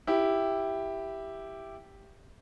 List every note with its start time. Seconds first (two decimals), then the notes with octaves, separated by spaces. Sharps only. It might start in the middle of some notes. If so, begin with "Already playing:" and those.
0.07 E4 G4